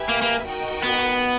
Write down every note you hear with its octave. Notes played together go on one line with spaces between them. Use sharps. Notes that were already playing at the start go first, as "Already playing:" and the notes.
Already playing: G4 B4 E5 G#5
A#3
A#3
D#4 F#4 A#4 D#5 G5
B3